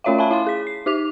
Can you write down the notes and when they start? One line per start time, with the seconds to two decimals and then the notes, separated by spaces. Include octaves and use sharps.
0.04 A3 C#4 F4 C#5 E5 F5
0.18 E5 F5 G#5 A5 B5
0.31 E4 F5 C6
0.47 G#4 B6
0.67 C7
0.86 D#4 G4 D6 F7